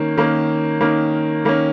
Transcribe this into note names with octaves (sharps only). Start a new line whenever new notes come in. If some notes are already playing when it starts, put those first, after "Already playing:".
Already playing: D#3 A#3 C#4
D#3 A#3 C#4
D#3 A#3 C#4
D#3 A#3 C#4